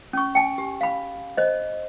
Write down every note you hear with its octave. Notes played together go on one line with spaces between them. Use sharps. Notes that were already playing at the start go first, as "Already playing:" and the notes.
C#4 C#6
G5 G#5
G4
F5 B5
C5 D#5